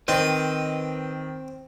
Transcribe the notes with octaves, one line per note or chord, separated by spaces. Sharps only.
D#3 C4 B4 D#5